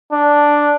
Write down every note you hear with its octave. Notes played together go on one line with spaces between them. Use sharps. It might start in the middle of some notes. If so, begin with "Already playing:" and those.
D4